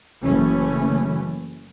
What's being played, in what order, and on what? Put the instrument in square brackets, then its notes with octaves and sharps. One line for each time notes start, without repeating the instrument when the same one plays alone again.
[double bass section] F#1 E3 A3 C#4